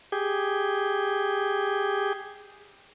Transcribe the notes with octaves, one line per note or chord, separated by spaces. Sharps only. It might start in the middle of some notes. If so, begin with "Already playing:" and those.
G4 G#4